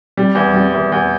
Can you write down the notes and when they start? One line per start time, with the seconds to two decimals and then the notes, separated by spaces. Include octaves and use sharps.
0.17 G3
0.35 E2
0.54 G3
0.73 E2
0.92 E2